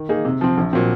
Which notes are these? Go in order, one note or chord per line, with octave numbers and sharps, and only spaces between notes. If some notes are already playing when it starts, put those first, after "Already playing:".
Already playing: D#3
A#3 D#4 G#4
C3
F3 C4
A#1
A#2 F#3 C4